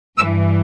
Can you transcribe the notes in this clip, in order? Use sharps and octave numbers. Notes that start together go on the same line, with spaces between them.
G2 E3 E6